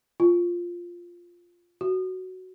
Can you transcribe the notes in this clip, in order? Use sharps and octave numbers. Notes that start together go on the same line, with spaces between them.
F4
F#4